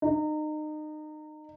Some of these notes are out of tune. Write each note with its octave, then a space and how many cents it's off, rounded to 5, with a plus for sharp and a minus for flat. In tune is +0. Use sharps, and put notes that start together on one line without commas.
D#4 -30